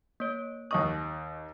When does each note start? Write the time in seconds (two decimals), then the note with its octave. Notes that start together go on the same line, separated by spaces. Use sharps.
0.20 A#3 C#5
0.71 D#2 D#5 C#6 D#6